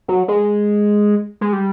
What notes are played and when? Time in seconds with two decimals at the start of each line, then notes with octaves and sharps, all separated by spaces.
0.08 F#3
0.28 G#3
1.41 G#3
1.53 G3